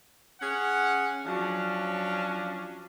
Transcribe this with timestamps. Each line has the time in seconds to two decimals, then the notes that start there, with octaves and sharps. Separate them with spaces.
0.40 C#4 G#4 F#5
1.25 F3 F#3 C#4 D4